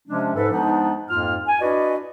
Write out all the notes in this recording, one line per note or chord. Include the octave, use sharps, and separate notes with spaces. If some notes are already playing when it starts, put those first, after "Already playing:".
C3 F3 G#3 C#4 D4
G#2 A4 B4
F3 G#3 B3 D4 D#4
F2 G#2 A#3 F4 F6
G#5
D4 E4 F#4 B4 D5 D#5